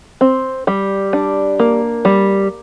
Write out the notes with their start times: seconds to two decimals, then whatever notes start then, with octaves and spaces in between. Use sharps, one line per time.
0.21 C4
0.67 G3
1.13 D4
1.59 A#3
2.05 G3